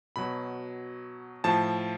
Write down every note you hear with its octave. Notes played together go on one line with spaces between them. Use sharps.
B2 F#3 B5
A2 F3 A5